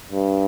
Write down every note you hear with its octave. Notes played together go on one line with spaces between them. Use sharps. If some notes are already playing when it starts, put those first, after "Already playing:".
G2